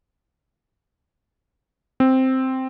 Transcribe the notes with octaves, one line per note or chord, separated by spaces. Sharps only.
C4